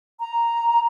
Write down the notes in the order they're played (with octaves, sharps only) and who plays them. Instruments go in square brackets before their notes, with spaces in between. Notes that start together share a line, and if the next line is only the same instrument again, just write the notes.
[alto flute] A#5